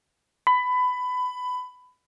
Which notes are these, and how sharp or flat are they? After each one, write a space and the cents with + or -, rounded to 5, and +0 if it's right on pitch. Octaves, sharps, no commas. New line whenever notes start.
B5 +20